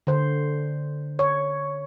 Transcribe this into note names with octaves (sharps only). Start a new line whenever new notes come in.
D3 C5
C#5